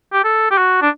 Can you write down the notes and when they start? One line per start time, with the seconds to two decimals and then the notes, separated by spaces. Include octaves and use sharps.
0.13 G4
0.24 A4
0.51 G4
0.58 F#4
0.82 D4